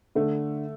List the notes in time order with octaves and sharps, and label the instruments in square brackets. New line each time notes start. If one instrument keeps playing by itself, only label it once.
[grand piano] D3 [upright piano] A3